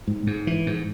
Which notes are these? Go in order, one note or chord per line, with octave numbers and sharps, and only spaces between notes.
G#2
G#2
E3
G#2